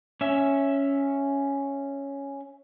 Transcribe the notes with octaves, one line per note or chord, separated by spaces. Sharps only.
C#4 E5